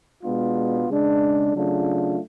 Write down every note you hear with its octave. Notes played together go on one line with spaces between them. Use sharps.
B2 G#3 B3 D4 F4
C#3 G#3 D4
C#3 F#3 A3 D4 F4